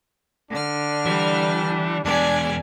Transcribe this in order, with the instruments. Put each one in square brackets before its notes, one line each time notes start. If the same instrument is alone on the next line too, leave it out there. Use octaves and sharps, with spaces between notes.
[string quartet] D3 F6 [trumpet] D4
[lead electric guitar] E3 [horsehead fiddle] G3
[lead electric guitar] E2 G#3 [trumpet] D4 [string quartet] D5 G#5